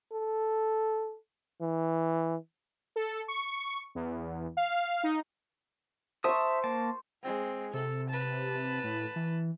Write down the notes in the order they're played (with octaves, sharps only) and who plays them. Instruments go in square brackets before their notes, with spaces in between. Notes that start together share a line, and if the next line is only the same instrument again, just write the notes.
[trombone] A4
E3
[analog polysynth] A4
C#6
E2
F5
D#4
[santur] C5 C#6 [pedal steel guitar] E5 A5 D#6
[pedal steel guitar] A#3 A5
[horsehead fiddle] G#3 C4
[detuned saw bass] C3 [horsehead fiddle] A4
[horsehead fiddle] B4 A5
[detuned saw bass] A2
E3